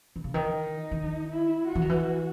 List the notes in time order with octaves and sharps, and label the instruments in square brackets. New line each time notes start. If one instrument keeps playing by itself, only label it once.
[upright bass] D#3
C#3
D#3
[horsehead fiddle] D#4
[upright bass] D#3
[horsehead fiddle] E4
F#4
[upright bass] E3
D#3
E3